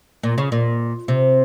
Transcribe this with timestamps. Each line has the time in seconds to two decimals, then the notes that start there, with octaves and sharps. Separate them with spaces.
0.23 A#2
0.38 C#3
0.52 A#2
1.08 C3